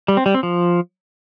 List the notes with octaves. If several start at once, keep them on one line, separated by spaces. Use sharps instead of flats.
G3
C4
G3
C4
F3